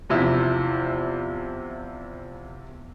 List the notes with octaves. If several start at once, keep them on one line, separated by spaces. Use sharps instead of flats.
E2 C3 F3 E4